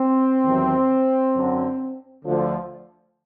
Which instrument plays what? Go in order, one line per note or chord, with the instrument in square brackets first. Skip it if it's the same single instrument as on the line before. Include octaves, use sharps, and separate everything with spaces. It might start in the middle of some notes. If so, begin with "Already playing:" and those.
Already playing: [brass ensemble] C4
E2 C3 D#3 F#3
F#2 D3 F#3
D2 D3 F3